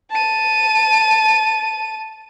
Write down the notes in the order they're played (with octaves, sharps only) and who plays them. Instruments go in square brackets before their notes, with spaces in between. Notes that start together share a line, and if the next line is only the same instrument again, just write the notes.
[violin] A5 D#7